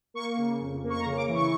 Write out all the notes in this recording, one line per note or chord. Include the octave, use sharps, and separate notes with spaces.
A#3 C#6
C#3
F2
A#3
C#6
A#5
C#3
D6
E3
C#6